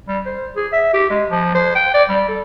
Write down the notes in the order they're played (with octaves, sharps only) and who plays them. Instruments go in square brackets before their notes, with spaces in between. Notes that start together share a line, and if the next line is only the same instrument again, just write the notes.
[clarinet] G3
C5
G#4
E5
G4
G#3
F3
C5
G5
D5
G3
A4